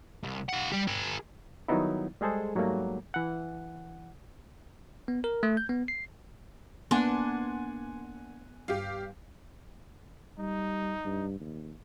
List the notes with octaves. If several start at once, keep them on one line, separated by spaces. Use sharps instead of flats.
C2
F4 F#5
G3 G4
G#4 A#4
D#3 F#3 G3 B3 D#4 E4
G3 G#3 G#4 A4 C5
G#2 F#3 G3 A3 A#3
E3 F#5
B3
A#4
A3
G6
B3
C7
A#3 B3 D4 F#5 G#5 C6
G2 G4 F5
G3 D#4
G2
D#2